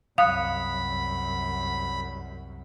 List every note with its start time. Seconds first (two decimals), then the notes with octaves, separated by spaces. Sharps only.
0.18 C2 F#2 F5 B5 D#6 F#6 C#7